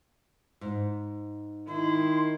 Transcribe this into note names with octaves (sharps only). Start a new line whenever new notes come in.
G#2
D#3 E4 C6